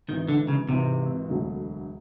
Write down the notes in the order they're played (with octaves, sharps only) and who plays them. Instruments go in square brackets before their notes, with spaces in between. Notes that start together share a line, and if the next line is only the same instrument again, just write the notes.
[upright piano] G#1 G#2 E3 [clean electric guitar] D#3
[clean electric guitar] D3
C#3
[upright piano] G#1 G#2 E3 [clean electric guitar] C3
[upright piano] E1 D2 D3 F#3